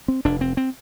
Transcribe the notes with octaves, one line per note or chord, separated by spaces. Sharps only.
C4
F1 D4
C4
C4